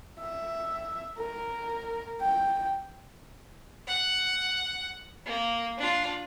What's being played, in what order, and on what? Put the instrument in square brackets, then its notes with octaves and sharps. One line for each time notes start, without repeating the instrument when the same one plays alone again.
[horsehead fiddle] E5
A#4
G5
[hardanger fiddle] F#5
A#3
D4 F4